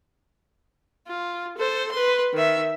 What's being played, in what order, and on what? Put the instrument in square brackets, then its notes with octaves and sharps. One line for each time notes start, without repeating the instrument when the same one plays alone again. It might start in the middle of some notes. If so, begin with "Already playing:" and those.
[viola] F4
A4 C5
B4 C6
D#3 E5